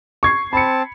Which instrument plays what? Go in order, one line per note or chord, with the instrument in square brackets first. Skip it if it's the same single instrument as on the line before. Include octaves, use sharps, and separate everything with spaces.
[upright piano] C#6 G#6 C7
[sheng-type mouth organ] C4 A5 [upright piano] B5 C#7